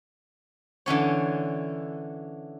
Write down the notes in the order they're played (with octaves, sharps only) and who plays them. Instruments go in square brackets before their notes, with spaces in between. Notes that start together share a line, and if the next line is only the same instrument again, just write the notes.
[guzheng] D3 E3 C#4 C#5